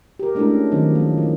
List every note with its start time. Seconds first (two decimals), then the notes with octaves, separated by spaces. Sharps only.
0.19 G4 A#4
0.35 G#3 A3 D4 E4 A4 A#4
0.50 C#4
0.72 D#3 F#3 C4 D#4
0.95 F3 A#3
1.18 E3 A#3